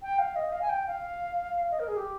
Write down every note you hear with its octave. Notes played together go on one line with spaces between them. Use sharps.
G5
F5
D#5
F5
G#5
G5
F5
D#5
A#4
G#4
G4